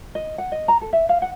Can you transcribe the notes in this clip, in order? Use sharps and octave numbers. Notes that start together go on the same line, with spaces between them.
D#5
F#5
D#5
A#5
A4
E5
F5
F#5